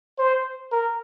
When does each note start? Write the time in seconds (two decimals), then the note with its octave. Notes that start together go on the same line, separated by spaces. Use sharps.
0.19 C5
0.72 A#4